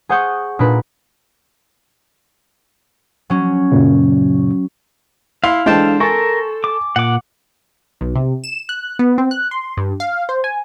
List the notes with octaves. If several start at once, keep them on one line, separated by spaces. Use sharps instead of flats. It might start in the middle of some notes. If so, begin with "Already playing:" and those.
G#4 C5 F#5 C#6 D#6 G6
A#2 D4 D#4 B4
F#3 C#4
F#2 A#2 C#3
E4 F5 C6
E3 G#3 D4 A4 C5 D#5 G5 A5
A4 A#4 G#5 C#6 A6
D6
A#2 F#5 D6
B1
C3
E7
F#6
B3
C4
F#6
C6
G2
F5
C5
G#5